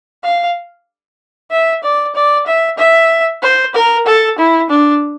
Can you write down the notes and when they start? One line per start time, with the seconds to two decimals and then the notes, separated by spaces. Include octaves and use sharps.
0.23 F5
1.51 E5
1.84 D5
2.15 D5
2.47 E5
2.78 E5
3.42 C5
3.75 A#4
4.06 A4
4.38 E4
4.70 D4